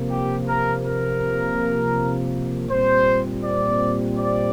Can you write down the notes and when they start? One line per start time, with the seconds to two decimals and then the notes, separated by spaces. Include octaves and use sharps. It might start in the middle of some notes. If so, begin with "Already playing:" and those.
Already playing: C3 F3 A#3
0.11 G4
0.48 A#4
0.85 A#4
2.70 A#2 G3 C4 C5
3.44 D5
4.18 D5